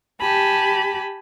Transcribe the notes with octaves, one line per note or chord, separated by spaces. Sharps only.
G4 G#5 A5 B5